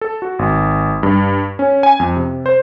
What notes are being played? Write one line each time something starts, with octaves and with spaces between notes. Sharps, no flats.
A4
F#4
G#1
G2
C#4
G#5
F2
C3
C5